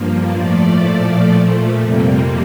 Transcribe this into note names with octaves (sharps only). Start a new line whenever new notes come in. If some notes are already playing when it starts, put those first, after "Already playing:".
Already playing: G2 F3 A#3
A2 F3 A3 D5
A#2 F3 A3 D5
A#2 F3 A3
F2 C3 G3 A#3